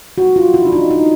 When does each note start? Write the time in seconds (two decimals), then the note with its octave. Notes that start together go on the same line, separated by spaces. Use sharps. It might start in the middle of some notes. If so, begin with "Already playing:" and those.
0.18 F#4
0.36 F4
0.54 E4
0.65 D4
0.72 D#4
0.91 D#4